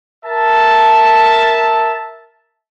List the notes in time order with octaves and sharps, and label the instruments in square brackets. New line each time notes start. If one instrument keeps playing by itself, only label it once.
[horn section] A#4 E5 A5